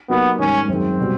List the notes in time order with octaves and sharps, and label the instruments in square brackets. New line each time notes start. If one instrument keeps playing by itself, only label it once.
[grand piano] F#3 A#3 D#4 G4 [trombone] B3
[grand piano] G#2 D#3 G3 [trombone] C#4
[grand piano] F#2 D#3 G#3 [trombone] C4
[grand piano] B2 G3